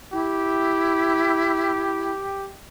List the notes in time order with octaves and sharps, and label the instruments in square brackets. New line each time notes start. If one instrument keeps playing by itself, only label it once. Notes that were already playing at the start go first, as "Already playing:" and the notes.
[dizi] E4 [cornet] G4